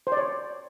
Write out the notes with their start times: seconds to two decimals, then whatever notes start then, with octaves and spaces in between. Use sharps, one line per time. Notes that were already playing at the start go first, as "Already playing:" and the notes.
0.07 C5
0.12 D5
0.17 C#5